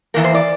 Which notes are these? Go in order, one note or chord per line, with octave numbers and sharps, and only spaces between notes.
E2 E3 A#3 A#4
C5
D5